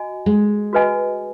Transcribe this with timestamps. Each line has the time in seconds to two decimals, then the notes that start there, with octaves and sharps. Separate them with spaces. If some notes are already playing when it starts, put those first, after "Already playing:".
Already playing: F#4 D#5 G#5
0.26 G#3
0.73 F#4 B4 D#5 G#5